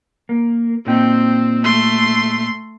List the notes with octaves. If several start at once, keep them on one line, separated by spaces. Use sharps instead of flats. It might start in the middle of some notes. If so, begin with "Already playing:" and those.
A#3
A#2 C4 D#4 G5
A3 C6